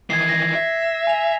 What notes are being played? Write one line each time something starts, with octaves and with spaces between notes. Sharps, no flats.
D#3 E3 G#6 C7
A#6
E5
G#5 F7